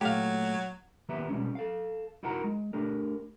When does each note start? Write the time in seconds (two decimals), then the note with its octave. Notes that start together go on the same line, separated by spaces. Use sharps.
0.01 A#2 F#3 A3 G4 F5
1.09 D#3 A#3 B3 G4 E5
1.29 B2 G3 G#3 C#4
1.55 A4 F5
2.23 D#4 E4 F#4 A#4 A#5
2.44 G#3
2.73 A3 D4 G4 A#4